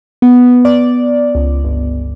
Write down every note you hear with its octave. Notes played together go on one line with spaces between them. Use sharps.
B3
D5
C#2
G1